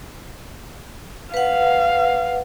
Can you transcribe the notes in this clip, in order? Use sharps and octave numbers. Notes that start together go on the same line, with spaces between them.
B4 F5 F#5